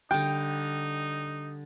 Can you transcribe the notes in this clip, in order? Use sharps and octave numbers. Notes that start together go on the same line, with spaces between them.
D3 G3 D#4 G5